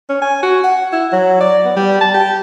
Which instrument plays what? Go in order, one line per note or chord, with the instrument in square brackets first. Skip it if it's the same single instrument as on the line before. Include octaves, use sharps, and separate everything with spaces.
[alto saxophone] C#4
G#5
F#4
F#5
E4
F#3
D5
B3
G3
A5
G4